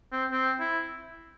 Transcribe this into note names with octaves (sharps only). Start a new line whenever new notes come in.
C4
C4
E4